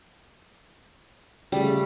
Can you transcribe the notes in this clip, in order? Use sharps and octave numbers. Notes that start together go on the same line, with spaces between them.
C#3 G3 A3